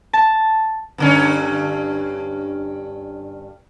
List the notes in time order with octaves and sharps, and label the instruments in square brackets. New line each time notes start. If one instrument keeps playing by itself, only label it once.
[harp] A5 A6
[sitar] G2 D3 C#4